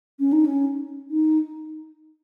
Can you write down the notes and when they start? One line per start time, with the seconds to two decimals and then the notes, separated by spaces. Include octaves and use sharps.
0.20 C#4
0.33 D#4
0.46 C#4
1.11 D#4